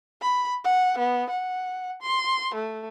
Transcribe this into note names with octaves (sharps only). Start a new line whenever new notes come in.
B5
F#5
B3
F#5
C6
A3